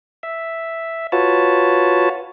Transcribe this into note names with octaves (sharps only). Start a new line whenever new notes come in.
E5
F4 F#4 B4 C#5 A5